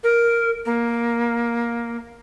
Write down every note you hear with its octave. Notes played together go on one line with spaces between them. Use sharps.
A#4
A#3